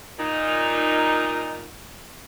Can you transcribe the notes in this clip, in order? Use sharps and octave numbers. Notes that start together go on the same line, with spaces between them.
A#2 D#4